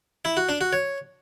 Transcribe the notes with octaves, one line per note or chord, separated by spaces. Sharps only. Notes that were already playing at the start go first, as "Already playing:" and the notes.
E4
F#4
D4
F#4
C#5